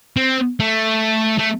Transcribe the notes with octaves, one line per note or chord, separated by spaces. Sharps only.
C4
A3
A3